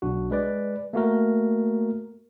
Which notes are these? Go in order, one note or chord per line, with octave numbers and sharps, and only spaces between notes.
B1 D4 F#4
G#3 B4 D5
A3 A#3 F#4 A#4